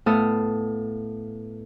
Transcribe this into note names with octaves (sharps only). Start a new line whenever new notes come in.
A2 B3 A4 F5 D#6 F6